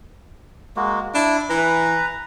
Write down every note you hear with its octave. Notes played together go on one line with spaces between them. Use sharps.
G#3 A#3 F#4
D4 E4
E3 B4 A#5